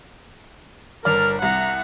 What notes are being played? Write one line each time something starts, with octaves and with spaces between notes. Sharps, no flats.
G1 A#4 D5 F6
C2 F#5 A#5